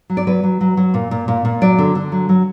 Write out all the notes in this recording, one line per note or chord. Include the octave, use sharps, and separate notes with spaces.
F#3
D5
F#3 B4
F#3
F#3
F#3
A#2
A#2
A#2
A#2
F#3 D5
D3
D3
F#3
F#3